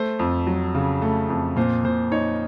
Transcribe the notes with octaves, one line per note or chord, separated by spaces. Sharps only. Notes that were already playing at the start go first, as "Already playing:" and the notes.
Already playing: A3 C5
F2
F#3
C#3
A3
F2
A#2 C5
A#2 C5
D#4 C#5